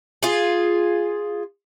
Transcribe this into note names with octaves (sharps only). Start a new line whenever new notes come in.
F4 G#4